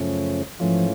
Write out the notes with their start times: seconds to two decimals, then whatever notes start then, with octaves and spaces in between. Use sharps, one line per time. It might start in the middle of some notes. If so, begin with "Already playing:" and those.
Already playing: F#2 C#3 F3 A3 C#4
0.60 G#2 E3 F3 A3 C#4 F4